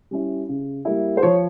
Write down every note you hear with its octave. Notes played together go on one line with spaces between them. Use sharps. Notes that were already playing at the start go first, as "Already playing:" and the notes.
G3 C#4 E4
C#3
G3 A#3 E4
C5
F3 C#5